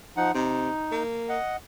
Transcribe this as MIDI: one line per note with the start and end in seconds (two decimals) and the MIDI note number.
0.17 0.32 53
0.17 0.32 63
0.17 0.32 78
0.34 0.70 48
0.34 1.03 63
0.91 1.37 58
1.29 1.57 75
1.29 1.57 78